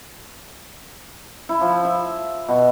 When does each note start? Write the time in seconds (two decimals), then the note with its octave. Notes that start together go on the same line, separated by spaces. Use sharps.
1.49 E4
1.61 F3
1.85 E5
2.48 B2